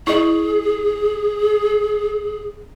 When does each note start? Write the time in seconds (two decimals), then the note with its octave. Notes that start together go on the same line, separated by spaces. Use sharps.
0.07 E4 G#4 D#5